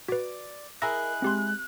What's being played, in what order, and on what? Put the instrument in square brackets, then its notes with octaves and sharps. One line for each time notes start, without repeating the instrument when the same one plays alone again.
[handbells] F#4 B4 [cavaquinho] D5
[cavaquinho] E4 G#4 D#5 [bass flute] A#4 [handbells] A#5 E6 A#6 [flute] F#6
[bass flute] G#3 [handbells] C4 G4 C6